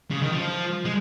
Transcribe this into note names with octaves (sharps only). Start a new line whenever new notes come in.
C#3
D#3
F3
G#3